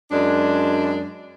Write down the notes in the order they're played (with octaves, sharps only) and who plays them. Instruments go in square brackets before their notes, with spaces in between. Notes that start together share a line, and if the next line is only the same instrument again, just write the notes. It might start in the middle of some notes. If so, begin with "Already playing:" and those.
[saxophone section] F#2 G#3 D4